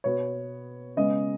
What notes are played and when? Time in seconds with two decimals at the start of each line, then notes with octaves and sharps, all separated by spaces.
0.04 B2 B3 C#5
0.97 C#3 G#3 B3 D#5